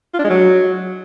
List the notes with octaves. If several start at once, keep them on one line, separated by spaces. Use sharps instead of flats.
F4
D4
G#3
F#3